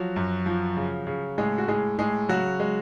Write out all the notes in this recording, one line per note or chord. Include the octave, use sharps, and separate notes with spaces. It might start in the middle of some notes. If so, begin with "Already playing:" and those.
Already playing: F3 F#3 F#4
F#2
F3
C#3
C#3
A2 G#3 G#4
F#4
A2 G#3 G#4
A2 G#3 G#4
C#3 F#3 F#4
G#3